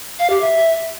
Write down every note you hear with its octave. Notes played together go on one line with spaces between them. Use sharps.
F5
G4
E5